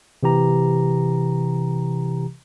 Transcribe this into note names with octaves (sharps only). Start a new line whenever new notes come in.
C3 E3 G4 A#5